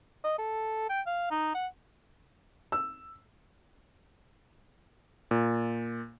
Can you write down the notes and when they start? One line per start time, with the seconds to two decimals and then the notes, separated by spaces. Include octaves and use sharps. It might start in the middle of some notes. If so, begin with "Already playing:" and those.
0.24 D#5
0.39 A4
0.89 G5
1.06 F5
1.31 D#4
1.55 F#5
2.72 E6
5.31 A#2